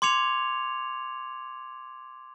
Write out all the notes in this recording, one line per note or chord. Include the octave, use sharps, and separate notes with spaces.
C6 D6 G#6 C#7 F7